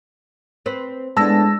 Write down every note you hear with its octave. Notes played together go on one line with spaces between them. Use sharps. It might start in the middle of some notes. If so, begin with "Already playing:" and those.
C4 B4 C5
A2 G#3 B3 D4 A5 E6 A#6